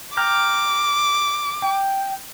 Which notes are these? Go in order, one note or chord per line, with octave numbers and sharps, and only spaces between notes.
G5 A#5 D6 F6
G5